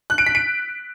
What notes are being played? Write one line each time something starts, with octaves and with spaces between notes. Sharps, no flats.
F#6
D7
B6
D7